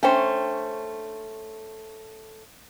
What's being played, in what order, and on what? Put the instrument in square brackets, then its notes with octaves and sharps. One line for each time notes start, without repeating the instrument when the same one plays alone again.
[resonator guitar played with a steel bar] A3 C#4 C5 [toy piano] D4 G5